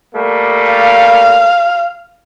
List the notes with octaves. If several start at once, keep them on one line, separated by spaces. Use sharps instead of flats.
G3 A3 A#3
F5